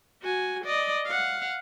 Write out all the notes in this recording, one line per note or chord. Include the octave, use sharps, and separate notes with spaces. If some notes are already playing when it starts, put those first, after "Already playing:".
F#4 G#5
D5 D#5
F5 F#5